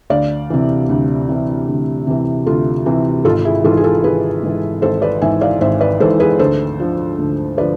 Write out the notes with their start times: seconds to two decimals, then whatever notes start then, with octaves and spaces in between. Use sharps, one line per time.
0.10 D2 D5 F5
0.50 C3 E3
0.89 D2
1.29 C3 E3
1.68 D2
2.07 C3 E3
2.46 D2 F4 A4
2.86 C3 E3
3.25 G#1 F4 A4
3.45 E4 G#4
3.64 G#2 E3 F4 A4
3.77 G#4
3.84 F4 A4
4.04 G#1 G#4 B4
4.43 G#2 E3
4.82 G#1 A4 C5
5.02 B4 D5
5.22 G#2 E3 E5 G#5
5.41 D5 F5
5.61 G#1 C5 E5
5.81 B4 D5
6.00 G#2 E3 A4 C5
6.20 G#4 B4
6.39 D2 A4 C5
6.79 D3 F3
7.19 D2
7.58 D3 F3 B4 D5